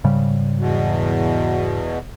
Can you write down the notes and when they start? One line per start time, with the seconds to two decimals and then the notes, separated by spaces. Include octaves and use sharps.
0.04 G#2 C#3 G3
0.59 E2 B2